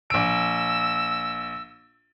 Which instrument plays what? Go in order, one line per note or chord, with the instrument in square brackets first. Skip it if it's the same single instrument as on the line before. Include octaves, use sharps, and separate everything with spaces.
[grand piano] A#1 D7 [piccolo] E6